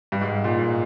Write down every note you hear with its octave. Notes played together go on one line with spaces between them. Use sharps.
G2
G#2
A#2
G#2